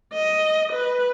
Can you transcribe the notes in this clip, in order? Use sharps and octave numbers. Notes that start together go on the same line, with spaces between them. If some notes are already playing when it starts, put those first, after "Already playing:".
D#5
B4